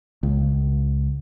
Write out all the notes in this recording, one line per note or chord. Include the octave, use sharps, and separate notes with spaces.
C#2